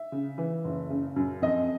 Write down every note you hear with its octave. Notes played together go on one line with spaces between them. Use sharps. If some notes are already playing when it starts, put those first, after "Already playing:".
Already playing: E5
C#3
E3
F#1
C#3
F#2
F2 D#5